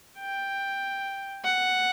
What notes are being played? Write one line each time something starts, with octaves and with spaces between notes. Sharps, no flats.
G5
F#5